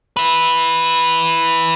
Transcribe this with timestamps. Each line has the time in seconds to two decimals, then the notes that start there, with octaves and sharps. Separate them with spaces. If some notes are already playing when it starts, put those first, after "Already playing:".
0.17 E4 B4